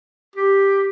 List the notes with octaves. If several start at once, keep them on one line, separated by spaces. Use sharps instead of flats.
G4